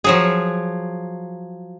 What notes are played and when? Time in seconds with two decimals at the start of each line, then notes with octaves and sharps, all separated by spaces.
0.04 F3 F#3 G#4